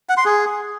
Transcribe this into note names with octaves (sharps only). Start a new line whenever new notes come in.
F#5
C6
G#4